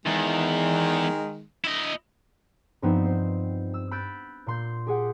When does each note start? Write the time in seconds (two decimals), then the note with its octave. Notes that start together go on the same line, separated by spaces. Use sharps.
0.06 E2 D#3 G#3
1.64 E4 D#5
2.82 G2 F3 B3 C4 D#4
3.05 C5
3.74 E6
3.91 B5 E6 F#6 G6 A6 D7
4.47 A#2 C6 G6
4.87 G4 G#4 F#5 G5